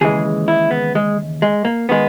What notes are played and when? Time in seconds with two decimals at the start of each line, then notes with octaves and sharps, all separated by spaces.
0.01 D#2 C#3 E3 G#3 G#4
0.48 E4
0.71 B3
0.95 G#3
1.42 G#3
1.65 A#3
1.89 D#3 G#3 B3